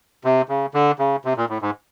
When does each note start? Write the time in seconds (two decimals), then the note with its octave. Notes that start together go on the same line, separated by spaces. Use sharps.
0.24 C3
0.49 C#3
0.74 D3
0.99 C#3
1.25 C3
1.37 A#2
1.49 A2
1.62 G#2